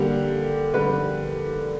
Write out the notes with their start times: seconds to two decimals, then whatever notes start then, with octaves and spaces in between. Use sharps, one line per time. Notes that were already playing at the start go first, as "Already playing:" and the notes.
Already playing: D3 G3 A#3 G4
0.74 D3 G3 B4